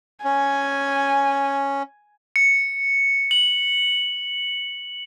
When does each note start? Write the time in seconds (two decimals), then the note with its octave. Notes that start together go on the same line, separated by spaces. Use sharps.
0.25 C#4 G#5
2.36 C#7
3.31 F#7